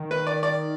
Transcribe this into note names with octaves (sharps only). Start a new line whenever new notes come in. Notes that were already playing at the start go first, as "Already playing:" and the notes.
Already playing: D#3
B4
D5
D5